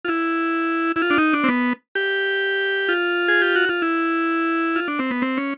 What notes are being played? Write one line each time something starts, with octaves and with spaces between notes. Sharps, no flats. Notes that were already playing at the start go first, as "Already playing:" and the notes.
F4
E4
E4
F4
D4
D#4
D4
C4
B3
G4
F4
G#4
G4
F#4
F4
E4
F4
D4
C4
B3
C4
C#4